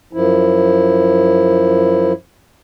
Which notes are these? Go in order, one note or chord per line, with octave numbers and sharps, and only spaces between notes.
F#2 F3 E4